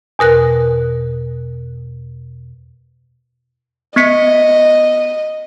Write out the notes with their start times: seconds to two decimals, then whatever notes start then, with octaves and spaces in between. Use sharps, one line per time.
0.19 E2 B2 A#4 F#6
3.96 B3 D#5 B6 C#7